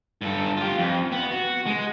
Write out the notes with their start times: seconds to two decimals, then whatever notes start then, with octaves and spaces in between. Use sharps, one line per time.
0.21 G2 A4
0.57 F4 G4
0.77 F2
1.12 B3
1.31 F#4
1.66 G#3